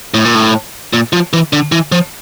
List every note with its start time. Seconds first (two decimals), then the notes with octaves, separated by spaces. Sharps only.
0.14 A2
0.25 A#2
0.35 A2
0.93 A#2
1.13 F3
1.33 E3
1.53 D3
1.72 E3
1.92 F3